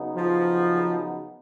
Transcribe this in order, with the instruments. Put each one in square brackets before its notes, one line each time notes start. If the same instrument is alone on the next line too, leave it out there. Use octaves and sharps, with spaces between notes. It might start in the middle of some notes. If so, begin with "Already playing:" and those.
Already playing: [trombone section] C#3 F#3 B3 D#4
[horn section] F3